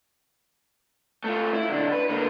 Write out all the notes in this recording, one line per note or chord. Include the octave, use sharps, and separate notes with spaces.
A3 F4
E4
B1 D3
B4
D3 A#3